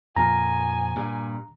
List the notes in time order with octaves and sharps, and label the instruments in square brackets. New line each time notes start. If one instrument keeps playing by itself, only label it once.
[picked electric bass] F2 A#2 F3 [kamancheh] G#5 [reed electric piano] A#5
[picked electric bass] G2 A#2